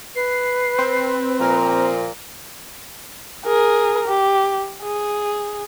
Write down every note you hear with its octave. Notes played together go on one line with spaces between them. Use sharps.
B4 C7
C4
A#2 F3 A#3 A#5
G#4 A#4
G4
G#4